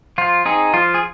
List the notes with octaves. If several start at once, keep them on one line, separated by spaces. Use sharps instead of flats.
F3 F4
C4 D#4 G#4
F3 F4
G#4